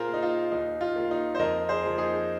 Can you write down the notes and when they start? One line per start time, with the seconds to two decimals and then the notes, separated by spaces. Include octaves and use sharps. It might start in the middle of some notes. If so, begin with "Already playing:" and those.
Already playing: A#2 F4 G#4 A#4 C5
0.08 A#3
0.14 D#4
0.22 F4
0.52 D#2 D#4
0.81 F4
0.96 D#3 A#3
1.11 D#4
1.35 C5
1.39 F2 A#4 D#5
1.69 G#4 C5
1.83 F3 A#3
1.98 D#4 G#4